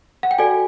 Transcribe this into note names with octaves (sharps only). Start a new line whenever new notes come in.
F#5
G5
F#4 A4 D5 G#5